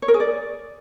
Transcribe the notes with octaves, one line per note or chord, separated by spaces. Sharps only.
C#5
A#4
G#4
D5